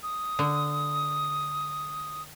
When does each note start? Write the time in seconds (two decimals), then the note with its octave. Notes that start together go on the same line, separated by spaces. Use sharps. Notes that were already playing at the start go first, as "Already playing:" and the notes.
0.03 D#6
0.39 D3